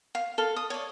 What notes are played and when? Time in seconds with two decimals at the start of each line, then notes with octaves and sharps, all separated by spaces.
0.15 F5
0.38 A4 F5
0.56 D#6
0.70 C#5 D5